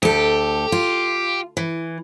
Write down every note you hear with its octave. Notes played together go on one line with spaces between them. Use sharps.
D2 G4 A4
F4
E3